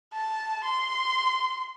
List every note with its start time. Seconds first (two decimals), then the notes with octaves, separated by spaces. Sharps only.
0.13 A5
0.64 C6